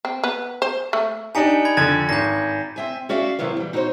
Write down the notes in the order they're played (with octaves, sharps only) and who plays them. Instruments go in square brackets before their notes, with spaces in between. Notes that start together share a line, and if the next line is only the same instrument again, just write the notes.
[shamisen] C4
B3
C5
A3
[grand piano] D4 D#4 G4 [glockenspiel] G#5 A#5 C#7
[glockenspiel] B5 G#6
[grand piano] F2 D3 G#6 [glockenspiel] A6
[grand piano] G#1 [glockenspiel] G6 A#6
[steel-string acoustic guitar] C4 E5 G#5
C#4 F#4 D5 E5 F5
C3 D#3 E3 F#3 A#3 B3
E3 G3
D#4 E4 F#4 A4 C5 C#5